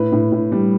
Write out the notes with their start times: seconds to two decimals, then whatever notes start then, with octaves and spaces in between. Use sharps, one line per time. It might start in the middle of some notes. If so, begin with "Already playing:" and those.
Already playing: A2 B4
0.12 A2
0.32 A2
0.52 G3